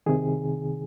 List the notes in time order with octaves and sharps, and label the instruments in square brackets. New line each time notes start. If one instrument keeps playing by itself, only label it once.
[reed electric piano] C2 C3 D#3 G#4